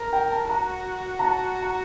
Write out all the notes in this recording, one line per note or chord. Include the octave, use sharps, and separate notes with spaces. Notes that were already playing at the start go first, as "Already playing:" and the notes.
Already playing: A#4
G5
A5
F#4 A#5
A#5
A5
A#5